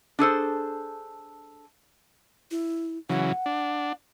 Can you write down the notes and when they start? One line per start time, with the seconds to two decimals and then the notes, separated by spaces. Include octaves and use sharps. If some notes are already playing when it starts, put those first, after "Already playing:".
0.19 D4 G#4 A4 C5
2.51 E4
3.09 C#3 E3 F#3 F#5
3.46 D4